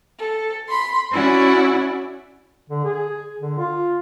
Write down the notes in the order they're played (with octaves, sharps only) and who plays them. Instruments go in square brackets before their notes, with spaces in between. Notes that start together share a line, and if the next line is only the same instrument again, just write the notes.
[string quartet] A4
B5 C6
C#4 E4 F#4 D5
[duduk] D3
G#4
D3
F4